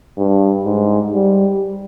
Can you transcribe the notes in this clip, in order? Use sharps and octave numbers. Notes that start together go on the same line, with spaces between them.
G2
G#2
G3